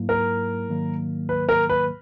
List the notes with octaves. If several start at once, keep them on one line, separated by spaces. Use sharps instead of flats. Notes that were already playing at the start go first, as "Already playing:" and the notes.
Already playing: G#2 F#3 A#3 E4
A#4
G#2 D#3 F#3 A#3
B4
A#4
B4